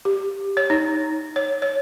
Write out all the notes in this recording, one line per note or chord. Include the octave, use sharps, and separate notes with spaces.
G4
C#5
D#4
C#5
C#5